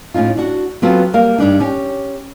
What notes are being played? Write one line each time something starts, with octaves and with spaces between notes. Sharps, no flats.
A2 C#4 D#4 F4
D4 F#4
F#3 B3 C4 F4 F#4 A4
G3 A#3 A#4 F5
G2 G3 D4 D#4
C#4 G4